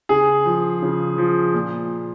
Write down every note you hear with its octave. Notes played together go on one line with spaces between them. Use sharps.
C#3 G#4
F3
C#3
F3
A#2